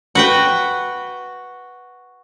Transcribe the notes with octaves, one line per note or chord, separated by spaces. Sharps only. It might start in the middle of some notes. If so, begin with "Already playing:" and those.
F#4 B4 G5